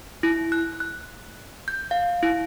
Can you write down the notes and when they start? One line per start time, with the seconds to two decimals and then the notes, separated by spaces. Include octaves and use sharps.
0.23 E4
0.52 F#6
0.80 F#6
1.68 G6
1.91 F5
2.23 E4